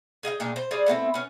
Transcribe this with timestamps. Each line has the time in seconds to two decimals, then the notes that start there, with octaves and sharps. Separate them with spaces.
0.23 G#4 D#5 F5 G5
0.40 A#2 G#3 D4 G4
0.56 C5
0.71 G3 G#4 C5 D5
0.86 A3 B3 C4 E4
1.14 B3 C#4